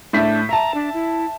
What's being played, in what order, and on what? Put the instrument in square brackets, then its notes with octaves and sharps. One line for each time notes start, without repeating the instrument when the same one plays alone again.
[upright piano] A2 E5 B6 [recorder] D4
[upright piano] E5 A5 [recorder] A#5
[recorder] D4
E4